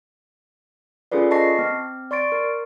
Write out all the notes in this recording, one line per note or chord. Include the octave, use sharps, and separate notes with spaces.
C#4 F4 G#4 A4 B4 D5
D#5 A5 C#6 A#6 C7
C4
D5 C6 C#6 A6 D7
A#4